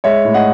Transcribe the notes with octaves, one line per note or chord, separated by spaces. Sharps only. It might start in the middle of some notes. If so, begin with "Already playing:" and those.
G#3 C#5 E5
A2
D#5 F#5